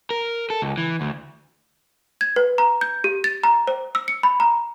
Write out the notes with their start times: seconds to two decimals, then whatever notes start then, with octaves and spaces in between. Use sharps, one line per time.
0.10 A#4
0.50 A4
0.62 C#2
0.78 E3
1.01 D2
2.21 G#6
2.36 B4
2.58 A#5
2.81 G6
3.04 G4
3.24 A6
3.44 A#5
3.67 C5
3.95 E6
4.08 C#7
4.23 B5
4.40 A#5